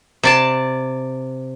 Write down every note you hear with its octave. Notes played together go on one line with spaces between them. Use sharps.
C3 D5 A5